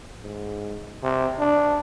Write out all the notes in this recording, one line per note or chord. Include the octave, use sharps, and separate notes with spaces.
G#2
C3
D4